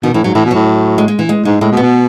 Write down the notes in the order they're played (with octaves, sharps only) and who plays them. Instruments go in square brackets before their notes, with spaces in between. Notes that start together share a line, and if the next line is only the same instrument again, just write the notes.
[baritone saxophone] B2 [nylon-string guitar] D#3
[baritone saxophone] A2 [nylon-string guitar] E3
[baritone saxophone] G#2 [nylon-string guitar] F#3
[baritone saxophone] A2 [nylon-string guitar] E3
[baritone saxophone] B2
[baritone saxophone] A2 [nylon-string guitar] F#3
[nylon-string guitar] G#3
G#3
E3
G#3
[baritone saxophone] G#2 [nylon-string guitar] G#3
[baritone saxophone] A2 [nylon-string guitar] G#3
[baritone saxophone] B2
[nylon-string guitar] B3
[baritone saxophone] B2